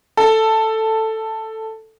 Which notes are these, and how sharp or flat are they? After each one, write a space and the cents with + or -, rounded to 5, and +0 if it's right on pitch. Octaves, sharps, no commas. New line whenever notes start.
A4 +5